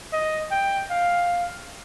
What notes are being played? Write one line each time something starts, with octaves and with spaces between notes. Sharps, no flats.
D#5
G5
F5